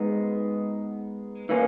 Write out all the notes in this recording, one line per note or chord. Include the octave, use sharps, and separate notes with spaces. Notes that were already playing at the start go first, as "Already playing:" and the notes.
Already playing: G#3 B3 D#4
E3 A#3 C#4